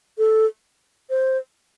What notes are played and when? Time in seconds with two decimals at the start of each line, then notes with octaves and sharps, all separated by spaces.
0.18 A4
1.10 C5